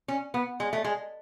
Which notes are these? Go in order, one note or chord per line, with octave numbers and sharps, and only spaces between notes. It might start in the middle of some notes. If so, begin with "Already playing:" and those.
C#4
B3
G#3
A3
G#3